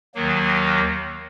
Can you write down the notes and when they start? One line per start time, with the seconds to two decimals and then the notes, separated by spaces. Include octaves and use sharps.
0.15 D#2 D#3 F#3 A#3